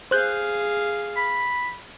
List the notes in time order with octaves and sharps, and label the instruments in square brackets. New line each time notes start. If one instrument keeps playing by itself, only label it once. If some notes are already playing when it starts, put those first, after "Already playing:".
[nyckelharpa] G#4 F5 [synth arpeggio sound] C5 F#6 G6
[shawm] B5